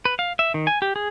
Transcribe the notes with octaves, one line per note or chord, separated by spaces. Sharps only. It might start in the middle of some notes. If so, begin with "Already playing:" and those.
B4
F5
E5
D#3
G#5
G4
G#4